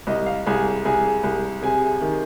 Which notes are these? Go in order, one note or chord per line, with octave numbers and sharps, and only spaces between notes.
C2 D#5
F5
C2 G#4 G#5
C2 G#4 G#5
C2
C3 G#4 G#5
D#3